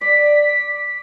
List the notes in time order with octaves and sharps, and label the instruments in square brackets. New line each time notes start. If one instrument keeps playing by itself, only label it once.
[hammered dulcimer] D5 [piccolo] B6